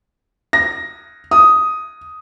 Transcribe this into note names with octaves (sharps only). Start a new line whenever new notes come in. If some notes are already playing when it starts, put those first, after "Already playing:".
A#6
D#6